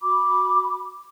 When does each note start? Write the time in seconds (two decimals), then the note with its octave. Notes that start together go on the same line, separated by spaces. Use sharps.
0.01 F#4 B5 D6